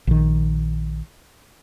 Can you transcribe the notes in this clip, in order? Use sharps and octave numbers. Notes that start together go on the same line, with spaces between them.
A#1 D#3